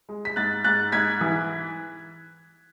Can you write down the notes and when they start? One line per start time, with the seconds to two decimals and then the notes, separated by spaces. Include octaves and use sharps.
0.09 G#3
0.25 B6
0.36 G#2 F#6 A6
0.64 G#2 F#6 A6
0.92 G#2 G#6 B6
1.21 E3